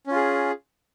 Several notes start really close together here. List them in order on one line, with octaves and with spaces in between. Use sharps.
C#4 F4 G#4